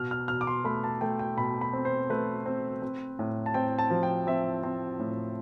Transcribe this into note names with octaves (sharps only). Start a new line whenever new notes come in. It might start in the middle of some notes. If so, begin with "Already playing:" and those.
Already playing: B2 F6
F6
B2 F6
D6
C6
A3 B5
A5
A3 G5
G5
B2 B5
B5
C4
C5
A3 B4
C4
C4
A2
A5
C4 G5
A5
F3
G5
C4 E5
C4
A2